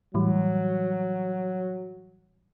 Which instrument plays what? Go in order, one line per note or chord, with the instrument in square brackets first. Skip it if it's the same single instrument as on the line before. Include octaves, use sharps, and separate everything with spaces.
[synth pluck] A2 E3 G3 [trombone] F#3